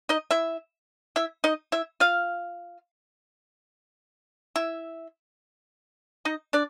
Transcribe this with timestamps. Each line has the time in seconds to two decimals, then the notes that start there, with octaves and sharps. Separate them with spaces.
0.09 D#4 D#5
0.31 E4 E5
1.16 E4 E5
1.44 D#4 D#5
1.72 E4 E5
2.00 F4 F5
4.56 E4 E5
6.25 D#4 D#5
6.53 D4 D5